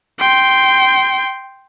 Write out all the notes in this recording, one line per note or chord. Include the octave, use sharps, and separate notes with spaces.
G5 C6